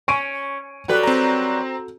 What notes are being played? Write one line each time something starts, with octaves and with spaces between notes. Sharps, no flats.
C#4 C#6 D7 D#7
F#3 G3 F#4 A4 B4
C4 A#5